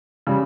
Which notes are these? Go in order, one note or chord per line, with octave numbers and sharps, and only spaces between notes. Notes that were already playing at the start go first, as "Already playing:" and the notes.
C#3 G3